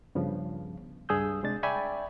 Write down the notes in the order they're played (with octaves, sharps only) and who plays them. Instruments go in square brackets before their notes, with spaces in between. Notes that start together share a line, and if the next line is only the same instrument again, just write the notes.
[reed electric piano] G2 C#3 F3 B3
C#2 G2 G#4 D#6 E6 G6
C3 G#3 D4 A6
D5 E5 G5 G#5 B5 C#6